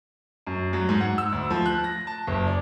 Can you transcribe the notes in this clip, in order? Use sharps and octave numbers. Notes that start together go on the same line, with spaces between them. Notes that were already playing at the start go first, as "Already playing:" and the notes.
F#2
F#3
G#2
F#5
E6
D2
F3
F#6
A#6
A5
F#1
D5